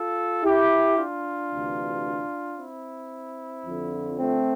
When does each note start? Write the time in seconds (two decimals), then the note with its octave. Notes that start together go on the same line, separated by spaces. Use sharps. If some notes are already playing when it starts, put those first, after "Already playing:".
Already playing: F4 A4
0.44 E4 G4
0.97 D4 F4
1.51 D2 C3 E3
2.58 C4 E4
3.65 F2 D3 F3
4.18 A3 C4